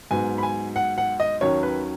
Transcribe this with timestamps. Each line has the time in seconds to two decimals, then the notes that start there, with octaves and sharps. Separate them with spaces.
0.11 G#2 F#3 B3 G#5
0.38 B5
0.43 G#5
0.76 F#5
0.98 F#5
1.20 D#5
1.41 D#2 D#3 F#3 C#4 C#5
1.63 B4